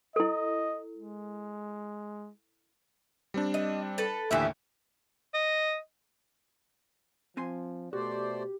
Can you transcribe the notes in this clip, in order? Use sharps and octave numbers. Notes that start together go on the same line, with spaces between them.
E4 A4 D#5
G#3
G3 C4 D4
D#5
A4 B4
D#2 A2 D3 E3 G4 E5
D#5
F3 C4 G#5 C6
B2 A3 F#4 G4 C5 D5